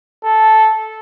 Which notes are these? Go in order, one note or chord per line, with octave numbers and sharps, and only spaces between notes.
A4